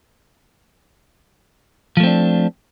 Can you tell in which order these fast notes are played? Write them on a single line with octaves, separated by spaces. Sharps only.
F3 A3 C4 D4